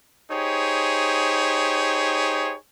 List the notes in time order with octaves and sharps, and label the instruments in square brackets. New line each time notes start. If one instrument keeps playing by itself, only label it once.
[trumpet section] D#4 G4 G#4 C5 C#5